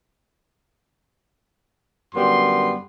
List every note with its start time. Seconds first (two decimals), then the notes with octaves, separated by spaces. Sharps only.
2.15 F#2 D3 G3 B3 C6